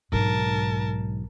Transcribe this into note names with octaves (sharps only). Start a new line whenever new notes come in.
B1 G#2 D3 A#4 A5